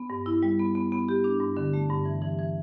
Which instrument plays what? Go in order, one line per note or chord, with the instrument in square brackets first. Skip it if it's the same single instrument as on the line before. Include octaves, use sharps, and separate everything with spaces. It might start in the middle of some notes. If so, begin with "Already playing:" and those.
Already playing: [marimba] B3
G2
E4
G3
B3
B3
B3
G4
D4
G2
D3
A3
G2
E3
E3
E3